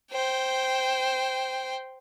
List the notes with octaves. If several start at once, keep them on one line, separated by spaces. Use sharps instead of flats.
C5 G5